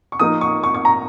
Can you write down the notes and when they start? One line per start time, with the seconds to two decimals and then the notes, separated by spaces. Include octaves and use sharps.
0.12 C#6
0.20 F3 A#3 D#4 D#6
0.41 C#6
0.64 C#6
0.75 C#6
0.85 A#5